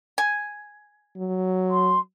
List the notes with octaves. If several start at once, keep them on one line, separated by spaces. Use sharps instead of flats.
G#5
F#3
C6